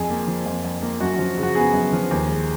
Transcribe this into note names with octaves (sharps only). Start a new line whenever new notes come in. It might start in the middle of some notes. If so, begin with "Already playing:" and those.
Already playing: F2 G#4
A#3
F3
F2
F2
A#3
F#2 F#4
F3 F#4
C#3
F#4
B3 G#4
F#2
F3
D#2
G#3